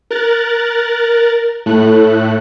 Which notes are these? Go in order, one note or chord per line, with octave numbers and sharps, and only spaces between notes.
A#4 F#6 A6
A2 A3 F#6